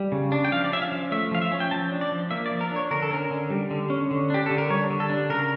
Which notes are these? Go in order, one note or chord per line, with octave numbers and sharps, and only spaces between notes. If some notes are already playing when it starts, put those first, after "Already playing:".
Already playing: G3
C#3
D4
G5
F3 F5
D5
C#4 E5
F5
F3
A3 E5
F3 F5
E5
C#4
G5
F3 A5
D4
D5
F3
A#3 E5
D5
F3
A#4
D4
C#5
D3 A#4
A4
C#4 A#4
D3
G3
D3
C#4
D3
D4 G4
D3 A4
A#4
G3 C#5
D3
A4
D4
C#3 A#4